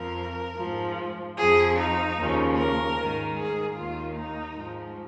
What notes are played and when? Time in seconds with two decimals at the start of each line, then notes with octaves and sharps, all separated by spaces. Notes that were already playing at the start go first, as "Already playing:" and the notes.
Already playing: F2 F3 A#4
0.58 G#2 F3
1.37 F2 F3 G#4
1.76 D#4
2.17 D#2 C#3 F3
2.56 A#4
2.97 G#2 D#3
3.36 G#4
3.75 D#2 D#3 F4
4.15 D#4
4.55 G#2 F3